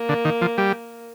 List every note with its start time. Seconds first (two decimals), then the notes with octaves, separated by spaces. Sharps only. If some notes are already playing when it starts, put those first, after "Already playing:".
Already playing: A#3
0.09 D3
0.25 D#3
0.41 F3
0.58 G3